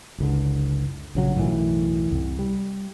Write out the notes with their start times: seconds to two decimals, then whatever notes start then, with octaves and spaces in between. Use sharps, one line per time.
0.18 F#1 C#2 D3
1.15 A#1 C#3 F#3
1.35 B1 F#2 A2 E3
2.11 C2
2.39 G3